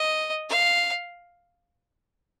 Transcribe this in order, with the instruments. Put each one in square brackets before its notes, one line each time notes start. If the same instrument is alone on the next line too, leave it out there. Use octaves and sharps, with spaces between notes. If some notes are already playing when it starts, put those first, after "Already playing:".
Already playing: [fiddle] D#5
F5